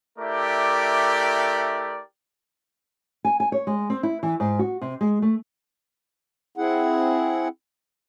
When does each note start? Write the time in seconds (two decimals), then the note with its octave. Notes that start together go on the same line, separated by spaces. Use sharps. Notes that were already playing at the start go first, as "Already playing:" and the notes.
0.18 A3 E4 G4 A#4 D5
3.25 G#5
3.40 G#5
3.52 C#5
3.67 G#3
3.90 C4
4.03 E4
4.23 E3
4.40 G#2
4.59 F#4
4.81 C3
5.01 G#3
5.22 A3
6.57 C4 E4 G#4 F#5